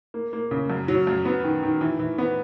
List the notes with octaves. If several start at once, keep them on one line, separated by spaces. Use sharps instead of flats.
A#3
A#3
C#3
F#2
F#3
F#2
B3
D#3
D#3
E3
E3
B3